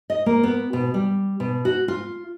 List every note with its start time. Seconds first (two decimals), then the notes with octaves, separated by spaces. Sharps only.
0.10 D#5
0.26 A#3
0.43 B3
0.73 B2
0.94 G3
1.40 B2
1.65 F#4
1.88 F4